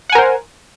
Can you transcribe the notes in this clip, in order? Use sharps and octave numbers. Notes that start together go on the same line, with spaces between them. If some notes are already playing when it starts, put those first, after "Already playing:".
A#4 C5 F#5 G#5